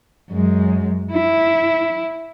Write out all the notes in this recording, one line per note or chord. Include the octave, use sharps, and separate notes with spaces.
F#2 G#3
E4